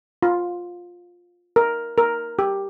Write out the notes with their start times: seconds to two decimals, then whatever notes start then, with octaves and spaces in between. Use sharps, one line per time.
0.23 F4
1.56 A#4
1.98 A#4
2.39 G4